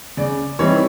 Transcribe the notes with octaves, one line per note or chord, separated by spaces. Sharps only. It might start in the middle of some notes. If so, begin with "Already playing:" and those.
C#3 D5
E3 G3 C4 D#4 C#5